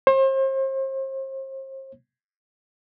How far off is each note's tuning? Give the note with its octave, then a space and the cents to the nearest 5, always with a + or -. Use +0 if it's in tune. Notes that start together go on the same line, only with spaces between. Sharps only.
C5 +40